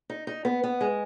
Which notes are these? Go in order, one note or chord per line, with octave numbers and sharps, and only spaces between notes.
D#4
D#4
B3
B3
G#3